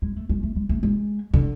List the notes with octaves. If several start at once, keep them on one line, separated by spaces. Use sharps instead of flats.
G#3
A3
G#3
A3
G#3
A3
G#3
D3